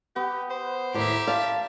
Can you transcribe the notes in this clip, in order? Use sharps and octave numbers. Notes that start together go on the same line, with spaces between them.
B3 G4
C5
D#2 A2 G4 E5 A#5 C6 D6
F5 A5